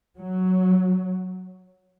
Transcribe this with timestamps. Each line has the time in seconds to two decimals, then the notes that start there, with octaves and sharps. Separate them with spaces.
0.18 F#3